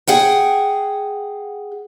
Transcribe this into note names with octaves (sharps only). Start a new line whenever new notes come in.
G#4 F#5 G5